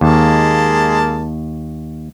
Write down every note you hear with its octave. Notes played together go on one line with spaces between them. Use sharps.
D#2 G#3 A#3 A5